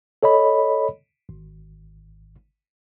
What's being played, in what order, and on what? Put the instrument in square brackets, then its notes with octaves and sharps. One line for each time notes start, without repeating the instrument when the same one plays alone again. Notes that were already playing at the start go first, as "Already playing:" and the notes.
[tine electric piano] A4 C#5 D#5 B5
G#1